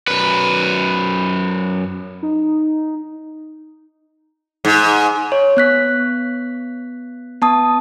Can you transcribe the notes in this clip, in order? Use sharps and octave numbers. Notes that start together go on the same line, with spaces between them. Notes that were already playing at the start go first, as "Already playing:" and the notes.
F#2 B4
D#4
G#2
C#5
B3 F#6 B6
B3 A5 D#6